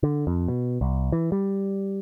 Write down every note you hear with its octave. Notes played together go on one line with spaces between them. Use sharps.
D3
F2
B2
C2
E3
G3